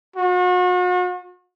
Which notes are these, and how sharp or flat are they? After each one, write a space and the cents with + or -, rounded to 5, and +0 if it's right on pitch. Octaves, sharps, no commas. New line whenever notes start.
F#4 -40